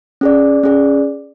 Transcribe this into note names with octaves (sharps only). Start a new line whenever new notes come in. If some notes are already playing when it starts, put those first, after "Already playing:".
C#4 G#4 D5
C#4 G#4 D5